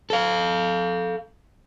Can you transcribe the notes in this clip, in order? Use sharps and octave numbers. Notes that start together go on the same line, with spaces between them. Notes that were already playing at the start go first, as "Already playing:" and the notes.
A4 F5